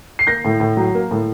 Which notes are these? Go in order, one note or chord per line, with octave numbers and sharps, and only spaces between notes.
C7
A#3 G6 A#6
A2
A2
F#3
A#3
A2